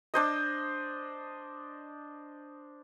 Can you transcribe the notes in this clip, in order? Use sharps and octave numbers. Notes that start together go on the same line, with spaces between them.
D4 C5 D#5